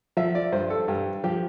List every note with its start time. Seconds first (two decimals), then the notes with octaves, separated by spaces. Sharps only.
0.17 F3 E5
0.35 D5
0.52 G2 C5
0.70 A4
0.88 G2 G4
1.24 F3 G4